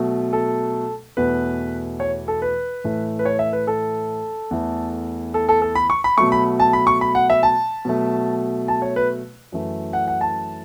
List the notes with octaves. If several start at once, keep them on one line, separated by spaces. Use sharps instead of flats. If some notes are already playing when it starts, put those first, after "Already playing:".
Already playing: B2 F#3 A3
A4
E2 B2 A3 B4
C#5
A4
B4
A2 E3 A3
B4
C#5
E5
B4
A4
E2 E3 A3
A4
A4
A4
B5
C#6
B5
B2 F#3 A3 C#6
B5
A5
B5
C#6
B5
F#5
E5
A5
B2 F#3 A3
A5
C#5
B4
F#2 E3 A3
F#5
F#5
A5